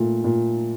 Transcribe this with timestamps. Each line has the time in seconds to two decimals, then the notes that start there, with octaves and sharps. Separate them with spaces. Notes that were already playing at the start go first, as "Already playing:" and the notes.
Already playing: A#2 A3
0.24 A#2